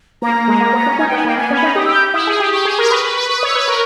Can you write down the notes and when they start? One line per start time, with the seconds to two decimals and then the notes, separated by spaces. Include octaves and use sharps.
0.22 A#3 A#5
0.35 A#3
0.48 G#3
0.60 A#3
0.73 B3
0.86 C#4
0.99 D#4 G#5
1.08 B3 G5
1.18 G#5
1.25 A#3 G5
1.37 B3 G#5
1.50 C#4
1.56 B5
1.63 D#4
1.75 G4 D#6
1.85 G4 E6
1.94 G6
2.14 E4 D#6
2.27 G#4
2.34 D#6
2.39 G4
2.52 G4 C#6
2.65 G#4
2.71 D#6
2.78 A#4
2.91 B4 C#6
3.04 B4
3.10 C#6
3.17 B4
3.22 B5
3.29 B4 C#6
3.39 C#5 D#6
3.49 E6
3.55 B4
3.68 A#4 C#6